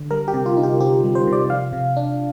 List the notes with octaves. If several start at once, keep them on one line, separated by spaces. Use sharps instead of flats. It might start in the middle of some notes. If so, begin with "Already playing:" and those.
Already playing: D3
G3 A#4
G4
C3
F4
D#4
G4
C4 G4
G3
C5
C3
D5
F3 F5
C3
D4